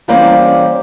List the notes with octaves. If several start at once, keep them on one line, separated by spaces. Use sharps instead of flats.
E3 G3 A#3 C4 C#4 D5